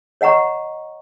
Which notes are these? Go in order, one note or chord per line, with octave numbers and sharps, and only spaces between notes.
C#5 D#5 F#5 A#5 C#6